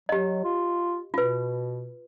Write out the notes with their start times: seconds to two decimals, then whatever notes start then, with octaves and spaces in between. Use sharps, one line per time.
0.09 F#3 G4 D#5
0.44 F4
1.14 B2 F4 B4